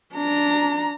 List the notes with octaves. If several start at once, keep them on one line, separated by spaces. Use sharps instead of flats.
D4 A#5